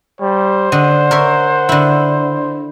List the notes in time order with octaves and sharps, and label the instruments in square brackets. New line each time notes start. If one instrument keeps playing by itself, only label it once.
[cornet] G3 [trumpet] C5
[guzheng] D3 D#5 [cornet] F#5
[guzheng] A#4 C#5 E5
D3 E4